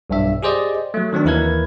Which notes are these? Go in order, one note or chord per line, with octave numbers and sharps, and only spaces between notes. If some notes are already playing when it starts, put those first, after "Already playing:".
B1 G2 E5
G4 G#4 C5 D5 D#5
F#3 A3
D#3 F#3 C4 D4
D#2 E3 E4 A#4 B4 G#6